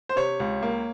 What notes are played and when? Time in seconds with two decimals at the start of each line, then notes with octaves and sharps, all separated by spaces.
0.09 C5
0.16 C3 C#5
0.40 C#2
0.63 A#3